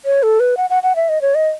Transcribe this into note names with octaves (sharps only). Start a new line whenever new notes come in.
C#5
A4
B4
F#5
F#5
F#5
E5
D#5
C#5
D#5